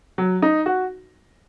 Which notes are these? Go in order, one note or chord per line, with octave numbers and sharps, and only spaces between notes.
F#3
D#4
F#4